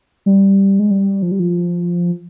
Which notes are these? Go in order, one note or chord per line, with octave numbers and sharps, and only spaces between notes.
G3
G#3
G3
F3
G3
F3